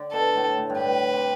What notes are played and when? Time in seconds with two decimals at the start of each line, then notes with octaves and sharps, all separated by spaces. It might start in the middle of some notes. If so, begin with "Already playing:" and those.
Already playing: D3
0.13 B2 A4
0.35 A2
0.58 A2
0.70 G2
0.80 A2 B4
1.13 C3